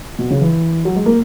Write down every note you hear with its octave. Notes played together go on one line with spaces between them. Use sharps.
B2
C#3
E3
F#3
G#3
A#3